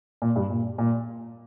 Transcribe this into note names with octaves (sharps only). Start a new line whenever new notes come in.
A#2
G2
A#2
A#2